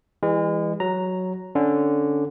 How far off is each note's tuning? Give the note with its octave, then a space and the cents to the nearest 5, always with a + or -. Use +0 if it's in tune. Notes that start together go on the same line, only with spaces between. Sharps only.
E3 +0 G#3 -35
F#3 +0 A#5 +0
D3 +0 C#4 -5